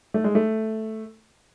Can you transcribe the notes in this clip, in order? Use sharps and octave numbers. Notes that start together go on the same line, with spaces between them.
A3
G#3
A3